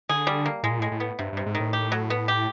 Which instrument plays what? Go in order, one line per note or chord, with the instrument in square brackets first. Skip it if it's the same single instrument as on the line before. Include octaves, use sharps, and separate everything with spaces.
[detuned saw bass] D3 [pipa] G#4
[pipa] G3
A#3
[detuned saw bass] A2 [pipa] G#3
[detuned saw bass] A#2
[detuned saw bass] A2 [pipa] G#3
[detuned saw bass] A2
[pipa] B3
[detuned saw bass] G2 [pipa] C3
[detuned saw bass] G2 [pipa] C3
[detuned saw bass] G#2
[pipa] D#3
[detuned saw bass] A2
[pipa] G4
F#3
B3
G4